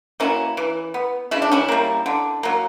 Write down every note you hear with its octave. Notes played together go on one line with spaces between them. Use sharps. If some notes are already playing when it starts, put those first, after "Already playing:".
F#3 A#3 C#4 E4
E3
B3
C#3 E4
D4
C#4 E4
G3 A#3
D3
F#3 A#3